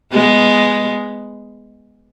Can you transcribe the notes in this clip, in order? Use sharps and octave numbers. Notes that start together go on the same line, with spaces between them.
G#3 B3